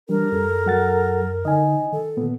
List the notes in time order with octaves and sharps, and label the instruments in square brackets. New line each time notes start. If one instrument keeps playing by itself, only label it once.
[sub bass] E3 [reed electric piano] G3 [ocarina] D4 [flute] A#4
[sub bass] F#2 [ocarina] A4
[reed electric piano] F#3 F#5 A6
[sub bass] D3 [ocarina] D#4 [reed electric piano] D#5 G#5
[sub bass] D#3 [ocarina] A4
[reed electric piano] A#2 B3